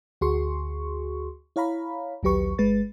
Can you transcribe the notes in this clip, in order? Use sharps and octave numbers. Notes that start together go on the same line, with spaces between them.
D2 F#4 G#4 C6 C#6
E4 C#5 F5 A#5 B5
A#1 D#2 F#3 G4 B4 C#6
G1 G#3 B4 A6